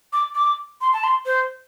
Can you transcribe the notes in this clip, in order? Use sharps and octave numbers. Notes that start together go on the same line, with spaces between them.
D6
D6
C6
A5
C6
C5